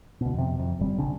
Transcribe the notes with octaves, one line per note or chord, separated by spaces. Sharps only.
D2 B2
F2 C3
F2
G1 G3 C4
A#1 C#3 C#4 D4